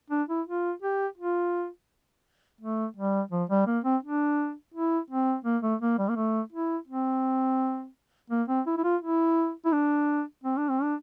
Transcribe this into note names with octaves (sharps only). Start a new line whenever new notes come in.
D4
E4
F4
G4
F4
A3
G3
F3
G3
A#3
C4
D4
E4
C4
A#3
A3
A#3
G3
A#3
A3
E4
C4
A#3
C4
E4
E4
F4
E4
E4
D4
C4
D4
C4
D4